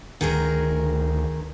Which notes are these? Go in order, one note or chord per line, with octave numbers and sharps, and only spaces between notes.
D2 D#3 G#4 A#4